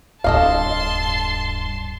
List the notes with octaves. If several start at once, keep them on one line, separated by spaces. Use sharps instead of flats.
D1 G2 A4 D#5 F5 A5 C6